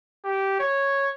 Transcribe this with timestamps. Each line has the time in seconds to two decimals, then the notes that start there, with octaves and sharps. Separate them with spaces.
0.24 G4
0.59 C#5